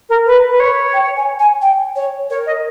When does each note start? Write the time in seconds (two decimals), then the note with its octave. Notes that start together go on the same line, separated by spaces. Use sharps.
0.09 A#4
0.26 B4
0.50 B4
0.60 C#5
0.93 G5
1.17 G#5
1.39 G#5
1.62 G5
1.96 C#5
2.30 A#4 C#5
2.46 D#5